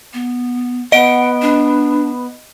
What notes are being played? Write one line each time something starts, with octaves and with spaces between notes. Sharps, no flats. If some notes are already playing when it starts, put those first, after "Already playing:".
B3
B3 D#5 F#5 D7
D4